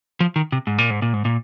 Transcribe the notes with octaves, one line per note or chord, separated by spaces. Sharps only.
F3
D#3
C3
G#2
A#2
G#2
A#2
G#2
A#2